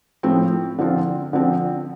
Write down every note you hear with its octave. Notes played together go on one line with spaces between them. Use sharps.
A2 F3 C4
D3 F3 C4 F4
D3 F3 C4